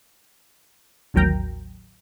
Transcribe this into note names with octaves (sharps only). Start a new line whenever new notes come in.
A1 D#2 F#3 A#4 G5 A#5